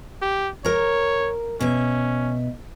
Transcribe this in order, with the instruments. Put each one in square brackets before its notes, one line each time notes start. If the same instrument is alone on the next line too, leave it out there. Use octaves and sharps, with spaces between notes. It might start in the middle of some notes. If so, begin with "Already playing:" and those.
[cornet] G4
[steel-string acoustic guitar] A#4 A#5 [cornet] C#5
[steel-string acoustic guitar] B2 E5 [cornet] C#4